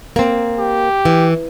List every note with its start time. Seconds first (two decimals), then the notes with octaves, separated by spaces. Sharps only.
0.16 A#3 C4
0.59 G4
1.05 E3